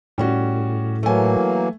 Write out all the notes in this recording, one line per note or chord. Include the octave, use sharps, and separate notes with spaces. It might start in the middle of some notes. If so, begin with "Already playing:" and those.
A2 G3 C#4 F#4
E3 F#3 A3 A#3 G#5